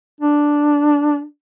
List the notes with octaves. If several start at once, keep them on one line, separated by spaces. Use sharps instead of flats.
D4